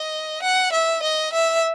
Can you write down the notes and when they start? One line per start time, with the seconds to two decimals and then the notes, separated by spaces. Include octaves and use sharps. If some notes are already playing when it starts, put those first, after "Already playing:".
Already playing: D#5
0.43 F#5
0.72 E5
1.02 D#5
1.33 E5